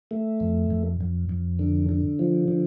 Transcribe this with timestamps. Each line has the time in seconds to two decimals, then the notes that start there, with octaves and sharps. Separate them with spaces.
0.11 A3
0.40 F2
0.71 F2
1.01 F2
1.29 F2
1.59 D3
1.89 D3
2.19 F3
2.48 D3